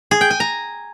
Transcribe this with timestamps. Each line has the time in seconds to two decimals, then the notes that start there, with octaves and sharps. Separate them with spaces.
0.11 G#4
0.21 G5
0.30 G#5
0.40 A#5